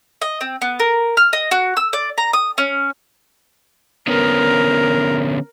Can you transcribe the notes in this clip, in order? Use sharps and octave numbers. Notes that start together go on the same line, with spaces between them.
D#5
C4
B3
A#4
F6
D#5
F#4
E6
D5
A#5
D#6
C#4
D3 B3 C#4 A#4